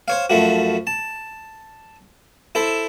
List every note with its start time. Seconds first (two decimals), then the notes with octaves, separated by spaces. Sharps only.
0.08 C5 C#5 F5
0.30 F#2 F3 A3 F#4
0.87 A5
2.55 E4 A4 C5 E5